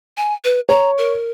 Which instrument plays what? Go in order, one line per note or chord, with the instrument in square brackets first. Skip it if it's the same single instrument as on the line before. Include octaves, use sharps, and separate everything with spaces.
[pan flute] G#5
B4
[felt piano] C#5 [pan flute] A#5
[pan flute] A#4